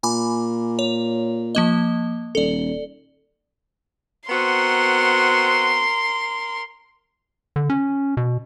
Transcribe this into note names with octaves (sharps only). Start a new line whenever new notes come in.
A#2 G#5 B5 D6
C#5
F3 A#3 D#5
D#1 A4 D5
B3 C4 F#4 A#4 C6
D3
C#4
B2